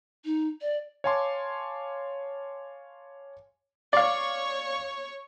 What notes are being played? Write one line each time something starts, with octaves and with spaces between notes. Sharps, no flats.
D#4
D5
C#5 F5 G#5 A5 C6 D6
C#5 D5 F5 C#6